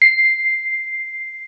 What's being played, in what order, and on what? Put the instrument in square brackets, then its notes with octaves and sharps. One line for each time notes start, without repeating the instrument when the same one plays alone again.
[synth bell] C7